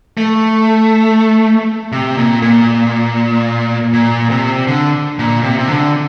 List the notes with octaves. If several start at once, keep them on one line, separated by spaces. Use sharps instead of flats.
A3
C3
A#2
A#2
A#2
C3
D3
A#2
C3
C3
D3